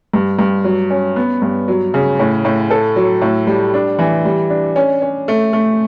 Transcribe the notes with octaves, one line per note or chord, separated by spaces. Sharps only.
G2
G2
F#3
C#4
B3
G2
F#3
C#3
A2
A2
A4
F#3
A2
G3
D4
E3
G3
D4
C#4
C#4
A3
A3